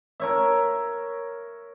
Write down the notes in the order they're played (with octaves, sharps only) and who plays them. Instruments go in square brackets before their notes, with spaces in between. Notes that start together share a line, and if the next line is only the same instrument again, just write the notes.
[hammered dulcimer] A#4 C#5 E5